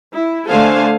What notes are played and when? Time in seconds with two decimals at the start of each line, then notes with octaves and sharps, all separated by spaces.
0.14 E4
0.48 D3 A3 A4 C5 F5 G#5